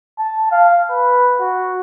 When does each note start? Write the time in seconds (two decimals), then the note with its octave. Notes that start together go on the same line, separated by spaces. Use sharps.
0.19 A5
0.52 F5
0.90 B4
1.40 F#4